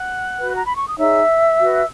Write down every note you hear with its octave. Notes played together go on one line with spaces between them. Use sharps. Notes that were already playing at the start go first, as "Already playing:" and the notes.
Already playing: F#5 F#6
F#4 B4
A#5
B5
C#6
D#6
D#4 G#4 C#5 E5 E6
F#4 B4